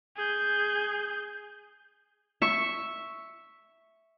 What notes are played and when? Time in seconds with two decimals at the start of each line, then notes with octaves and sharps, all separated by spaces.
0.16 G#4 G6
2.42 E5 C#6